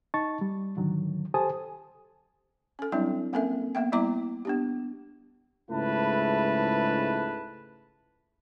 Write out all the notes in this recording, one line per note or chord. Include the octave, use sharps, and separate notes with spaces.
D#4 D#5 A5 C#6 A6
G3
G#2 D3 D#3 F#3
G4 A4 C5 G#5 A5 D#6
C#4 A4
F#3 G3 C4 D4 E4 E5
A#3 C4 C#4 A4 A#4 E5
A#3 B3 E5 G5
G3 B3 E4 E5 A#5 D6
B3 D4 G4
C#2 G#2 A3 E4 B4 A5